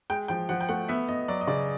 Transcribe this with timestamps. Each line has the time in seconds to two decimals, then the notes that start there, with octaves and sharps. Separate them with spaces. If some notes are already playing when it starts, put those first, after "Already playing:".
0.10 G#3 G5
0.28 F3 G5
0.49 F3 F#5
0.61 G5
0.69 A3 F#5
0.89 B3 E5
1.08 B3 D#5
1.28 F#3 D5
1.41 D#5
1.47 C#3 D5